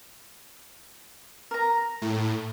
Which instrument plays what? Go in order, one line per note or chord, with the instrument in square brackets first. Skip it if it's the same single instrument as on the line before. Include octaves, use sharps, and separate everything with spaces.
[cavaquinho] A#4 A#5
[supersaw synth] A2